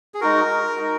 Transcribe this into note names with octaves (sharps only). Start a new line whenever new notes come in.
G#4
G#3 D#4 F#4 A#4
G#3 D#4 F#4